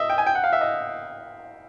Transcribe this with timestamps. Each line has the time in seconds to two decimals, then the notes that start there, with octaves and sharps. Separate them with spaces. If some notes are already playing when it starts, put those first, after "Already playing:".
Already playing: D#5 E5
0.10 G5
0.18 G#5
0.27 G5
0.35 F#5
0.44 F5
0.53 E5
0.61 D#5